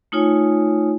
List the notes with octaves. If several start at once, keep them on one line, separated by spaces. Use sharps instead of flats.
A3 D#4 F4 C#5 G#5